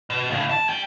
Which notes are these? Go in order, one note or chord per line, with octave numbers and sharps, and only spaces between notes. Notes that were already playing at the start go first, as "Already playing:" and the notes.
B2
A2 C#3
C2 A5
G3 G5